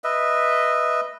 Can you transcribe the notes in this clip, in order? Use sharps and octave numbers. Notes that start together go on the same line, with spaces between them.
B4 D#5 E5